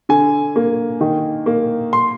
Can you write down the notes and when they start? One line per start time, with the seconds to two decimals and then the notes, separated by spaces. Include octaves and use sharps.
0.09 D3 G#5
0.56 A#3
1.01 D#3
1.46 A#3
1.93 C6